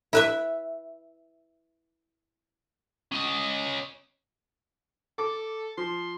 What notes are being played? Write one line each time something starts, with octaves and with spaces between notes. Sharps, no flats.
E4 B4 E5
C#4 D#5
A4 D6
F3 C6